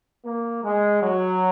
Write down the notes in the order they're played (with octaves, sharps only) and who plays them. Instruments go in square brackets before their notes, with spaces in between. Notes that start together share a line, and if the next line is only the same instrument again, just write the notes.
[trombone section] A#3
G#3
F#3